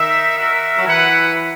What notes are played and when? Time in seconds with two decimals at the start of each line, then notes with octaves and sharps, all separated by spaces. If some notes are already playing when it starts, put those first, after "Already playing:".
Already playing: D#3 D#4 A#4 E5
0.38 F#4 A#4 E5
0.77 F#3
0.85 E3 E4 B4 F#5